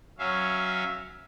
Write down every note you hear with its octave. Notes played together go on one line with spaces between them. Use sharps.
F#3 C#4 E5 F5